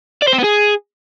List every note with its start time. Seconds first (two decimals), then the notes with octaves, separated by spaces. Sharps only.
0.22 D5
0.28 C5
0.33 C4
0.38 B3
0.44 G#4